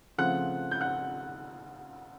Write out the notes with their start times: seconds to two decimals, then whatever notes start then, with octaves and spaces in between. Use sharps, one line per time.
0.18 C#3 F3 A3 C4 F#5 F#6
0.71 G6
0.81 F#5 F#6